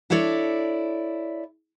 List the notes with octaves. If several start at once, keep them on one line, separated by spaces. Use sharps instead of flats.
D4 E4 A4 C#5 D5